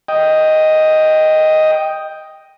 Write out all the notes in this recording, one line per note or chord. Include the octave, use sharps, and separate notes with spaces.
D#5 G5